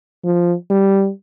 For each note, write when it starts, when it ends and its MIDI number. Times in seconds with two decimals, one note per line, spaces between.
0.24 0.54 53
0.70 1.09 55